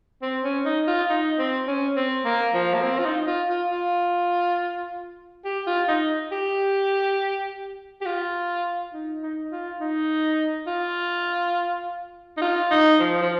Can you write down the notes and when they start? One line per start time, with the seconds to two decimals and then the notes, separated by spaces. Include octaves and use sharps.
0.22 C4
0.43 C#4
0.65 D#4
0.87 F4
1.09 D#4
1.39 C4
1.67 C#4
1.96 C4
2.25 A#3
2.54 F3
2.74 A#3
2.83 C4
2.99 F4
3.05 D#4
3.27 F4
3.49 F4
3.71 F4
5.45 G4
5.67 F4
5.88 D#4
6.32 G4
8.01 G4
8.06 F4
8.93 D#4
9.22 D#4
9.51 F4
9.80 D#4
10.67 F4
12.37 D#4
12.42 F4
12.71 D#4
13.00 F3
13.22 F3